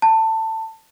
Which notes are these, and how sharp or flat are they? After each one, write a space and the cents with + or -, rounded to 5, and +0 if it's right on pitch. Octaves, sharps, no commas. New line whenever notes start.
A5 +20